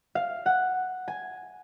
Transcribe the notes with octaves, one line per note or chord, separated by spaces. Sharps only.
F5
F#5
G#5